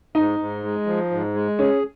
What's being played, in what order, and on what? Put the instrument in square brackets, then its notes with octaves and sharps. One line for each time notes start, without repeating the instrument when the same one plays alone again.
[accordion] G#2 [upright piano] D#4
[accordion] G#2
G#3
F3
G#2
G#3
[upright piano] C#4 [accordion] G#4